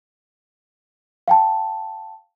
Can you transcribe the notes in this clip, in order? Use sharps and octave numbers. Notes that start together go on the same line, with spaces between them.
F5 G5 A5